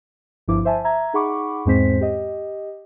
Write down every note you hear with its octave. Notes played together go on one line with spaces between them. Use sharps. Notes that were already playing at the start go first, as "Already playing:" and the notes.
G1 G2 F3 E4 D6
C5 E5 G#5 A5
E5 A#5 G#6
D#4 G#4 F#5 B5 C#6 D6
E2 G#2 G#3 C4 C5 B6
G4 D#5